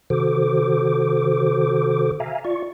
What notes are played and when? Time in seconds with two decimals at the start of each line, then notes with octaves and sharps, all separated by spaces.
0.10 C3 D#3 F#4 A4 C5 D6
2.20 E5 F5 G#5 A#5
2.44 F4 D5 C#6